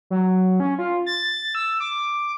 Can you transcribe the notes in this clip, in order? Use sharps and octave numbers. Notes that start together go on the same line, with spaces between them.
F#3
C#4
F4
A6
E6
D6